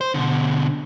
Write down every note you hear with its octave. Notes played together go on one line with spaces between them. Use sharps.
C5
B2 D3